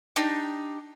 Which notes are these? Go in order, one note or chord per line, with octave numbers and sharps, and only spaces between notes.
D4 D#4 G4